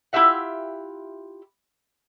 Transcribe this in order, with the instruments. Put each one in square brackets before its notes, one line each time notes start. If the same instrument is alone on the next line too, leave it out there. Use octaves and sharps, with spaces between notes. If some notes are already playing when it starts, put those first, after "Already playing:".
[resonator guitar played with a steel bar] E4 F4 G4 E5 F#5